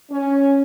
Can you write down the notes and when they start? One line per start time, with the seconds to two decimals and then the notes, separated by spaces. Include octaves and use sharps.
0.11 C#4